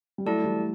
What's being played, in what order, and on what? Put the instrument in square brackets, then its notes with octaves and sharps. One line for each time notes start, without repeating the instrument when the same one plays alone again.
[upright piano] G3
[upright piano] F#3 A3 [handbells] E4 A4 D5 A5
[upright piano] E3 G3